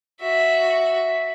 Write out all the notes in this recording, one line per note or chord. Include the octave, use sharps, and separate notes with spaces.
F#4 E5